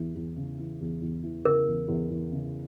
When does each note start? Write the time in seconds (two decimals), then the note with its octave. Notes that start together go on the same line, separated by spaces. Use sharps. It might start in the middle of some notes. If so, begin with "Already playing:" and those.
Already playing: E2 E3
0.15 E2
0.36 C#3
0.58 E3
0.81 E2
1.02 E2
1.23 E3
1.45 C#3 A#4
1.67 E2
1.88 E2
2.10 E2
2.32 C#3